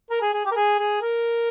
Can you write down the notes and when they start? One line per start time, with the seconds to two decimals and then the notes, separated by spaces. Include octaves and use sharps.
0.10 A#4
0.22 G#4
0.33 G#4
0.45 G4
0.51 A#4
0.56 G#4
0.79 G#4
1.02 A#4